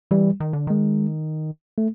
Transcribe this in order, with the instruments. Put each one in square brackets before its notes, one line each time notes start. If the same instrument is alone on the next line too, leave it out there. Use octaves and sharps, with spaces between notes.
[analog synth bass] E3 [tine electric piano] G3
[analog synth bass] D#3
D3
[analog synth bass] D#3 [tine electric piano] G#3
[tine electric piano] A3